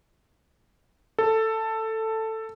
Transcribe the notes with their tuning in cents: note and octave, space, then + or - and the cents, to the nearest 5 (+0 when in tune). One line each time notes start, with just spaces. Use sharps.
A4 +10